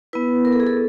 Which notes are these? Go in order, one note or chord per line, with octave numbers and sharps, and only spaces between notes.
B3 E4 B4
A#4
A4
G#4
A4